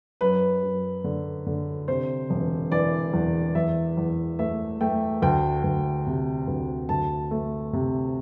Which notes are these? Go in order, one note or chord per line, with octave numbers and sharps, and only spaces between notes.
F#2 B4
F#2
D3
D3
C3 C5
E1
E3 D5
E2
E2 E5
E2
A3 E5
A3 G5
D2 G5
D2
C3
D2
D2 A5
A3
C3